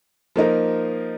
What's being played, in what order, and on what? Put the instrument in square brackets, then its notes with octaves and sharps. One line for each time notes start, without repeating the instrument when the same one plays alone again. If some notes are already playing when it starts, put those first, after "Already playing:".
[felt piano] F3 A#3 D#4 A#4